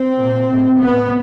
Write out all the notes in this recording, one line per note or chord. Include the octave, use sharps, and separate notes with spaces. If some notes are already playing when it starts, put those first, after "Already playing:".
Already playing: C4
A#2
A2
A2 B3